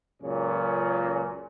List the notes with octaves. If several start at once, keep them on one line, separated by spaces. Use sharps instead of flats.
C#2 F#2 A#2 C#3 C#4